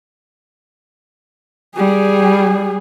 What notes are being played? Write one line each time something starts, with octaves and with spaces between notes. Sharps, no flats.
G3 G#4